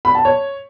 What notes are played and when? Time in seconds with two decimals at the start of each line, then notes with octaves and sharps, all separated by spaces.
0.05 B5
0.15 A5
0.25 C#5